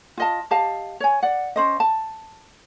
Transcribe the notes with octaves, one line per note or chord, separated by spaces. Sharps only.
F4 D#5 A5
G4 D#5 F5 A5
C#5 G#5
D5 F#5
C#4 C5 D#5
A5